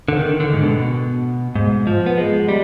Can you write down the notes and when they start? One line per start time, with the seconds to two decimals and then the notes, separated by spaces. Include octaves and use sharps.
0.08 D3
0.17 D#3
0.40 D3
0.53 G#2
0.63 B2
1.55 G#2
1.87 F3
2.06 B3
2.18 G#3
2.49 G3